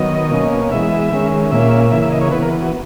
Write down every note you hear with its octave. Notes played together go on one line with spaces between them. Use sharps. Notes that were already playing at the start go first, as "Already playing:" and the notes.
Already playing: D#3 F#3 B3 D#5
B2 A#3 C#4
E3 G#3 B3 E5
D#3 G#3 C#4
A#2 A#3 C#4 E5
C#3 E3 A#3 E5
E5
D#5
C#5
E3 B3 B4
A#4
F#4